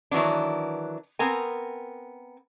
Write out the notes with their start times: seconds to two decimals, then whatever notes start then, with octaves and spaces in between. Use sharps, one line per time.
0.11 D#3 E3 F#3 B3 D4
1.19 B3 C4 A#4 G#5